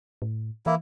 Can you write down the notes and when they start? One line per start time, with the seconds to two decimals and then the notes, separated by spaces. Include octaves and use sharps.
0.22 A2
0.66 E3 A#3 E4